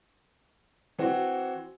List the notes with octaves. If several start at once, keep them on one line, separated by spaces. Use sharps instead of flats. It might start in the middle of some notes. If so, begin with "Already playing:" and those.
E3 C4 F#4